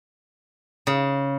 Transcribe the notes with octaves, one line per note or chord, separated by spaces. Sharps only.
C#3